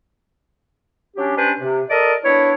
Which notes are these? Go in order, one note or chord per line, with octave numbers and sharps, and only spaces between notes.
F#3 C#4 D4 G4
G3 C#4 D4 B4 C5
C3
A4 A#4 D5 D#5
B3 D4 E4 C#5